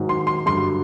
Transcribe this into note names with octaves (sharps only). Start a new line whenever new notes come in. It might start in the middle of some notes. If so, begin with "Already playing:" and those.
Already playing: G#2 D#3 F#3
C6
C6
G2 D3 F#3 C6